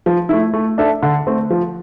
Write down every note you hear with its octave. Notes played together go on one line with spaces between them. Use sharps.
F3
A3 E4
A3
D4 A4 E5
D3
A3 C4
F3